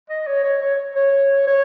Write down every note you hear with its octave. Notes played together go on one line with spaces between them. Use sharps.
D#5
C#5
C#5
C#5
C#5
C#5